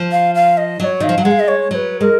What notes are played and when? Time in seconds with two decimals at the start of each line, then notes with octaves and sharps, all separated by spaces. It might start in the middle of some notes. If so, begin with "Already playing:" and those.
Already playing: F3
0.12 F5
0.35 F5
0.57 D#5
0.80 F#3 D#5
0.84 C#5
1.00 D#3 F5
1.09 F3
1.18 F#3
1.23 G#3 F#5
1.31 F5
1.40 D#5
1.48 C#5
1.70 F#3 B4 C#5
2.01 G#3 A#4